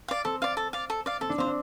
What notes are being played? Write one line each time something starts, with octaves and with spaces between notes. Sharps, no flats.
D5 F5
C4 A4
D5 F5
A4
D5 F5
A4
D5 F5
C4 A4
D4
C4 C5 F5
D4